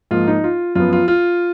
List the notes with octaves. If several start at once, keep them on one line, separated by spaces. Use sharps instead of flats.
G#2 F3 A#3 F4
D#4
F4
F#2 F3 B3 F4
F4
F4